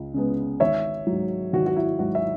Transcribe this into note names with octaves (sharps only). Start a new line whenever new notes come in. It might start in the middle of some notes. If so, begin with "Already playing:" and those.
Already playing: C#2 C#3
C#3 G#3 B3
G#1 C#5 E5
G#2 F#3
G#1 F#4
F#4
E4
G#2 F#3 F#4
E5